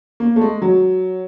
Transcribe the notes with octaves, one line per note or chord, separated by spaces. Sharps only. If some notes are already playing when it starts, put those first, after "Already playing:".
A#3
A3
G#3
F#3